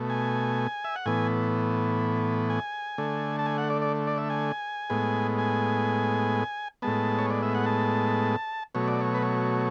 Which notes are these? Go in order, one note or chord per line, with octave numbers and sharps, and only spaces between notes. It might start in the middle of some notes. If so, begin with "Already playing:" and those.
Already playing: B2 A3
G#5
E5
F#5
A2 E3 B3 G#5
G#5
D3 A3
A5
G#5
F#5
D5
D5
D5
E5
G#5
A2 G#3 B3
G#5
A2 G#3 B3 A5
C#5
D5
E5
F#5
A5
B2 F#3 A3 C#5
D5
C#5
B4
C#5